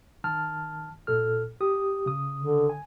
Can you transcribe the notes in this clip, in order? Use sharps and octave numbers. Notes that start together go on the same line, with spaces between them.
D#3 A5 F6
A#2 A4 F6
G4 D#6
C#3 D#6
D3
G#5